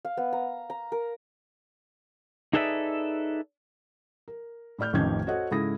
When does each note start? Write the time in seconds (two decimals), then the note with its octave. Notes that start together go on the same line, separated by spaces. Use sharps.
0.05 F5
0.17 B3
0.33 A#5
0.70 A#5
0.92 A#4
2.53 D#4 G#4 A4 B4 D5 E5
4.28 A#4
4.79 A2 E4 D5 F6 G6
4.93 A1 F2 D#3 C#4 G6 G#6
5.27 F#4 A4 C5 C#5 D#5 F#5
5.51 G#2 C#3 E4 A4 D#6 A#6